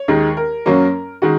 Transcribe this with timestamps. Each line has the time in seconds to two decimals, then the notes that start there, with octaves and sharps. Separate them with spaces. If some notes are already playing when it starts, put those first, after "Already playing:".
Already playing: C#5
0.08 D#2 D#3 G#3
0.37 A#4
0.66 F#2 F#3 A#3 C#4
1.22 D#3 G#3 F#4